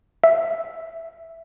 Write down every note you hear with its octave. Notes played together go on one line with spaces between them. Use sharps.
E5